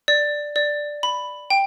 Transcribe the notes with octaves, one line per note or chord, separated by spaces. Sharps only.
D5
D5
B5
G5